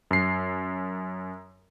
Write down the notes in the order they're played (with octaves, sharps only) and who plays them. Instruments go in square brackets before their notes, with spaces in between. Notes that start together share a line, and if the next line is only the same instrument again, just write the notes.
[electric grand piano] F#2 C7